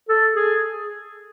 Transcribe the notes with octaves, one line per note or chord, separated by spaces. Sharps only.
A4
G#4